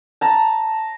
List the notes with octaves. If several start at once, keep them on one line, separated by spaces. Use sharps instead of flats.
A5 A#5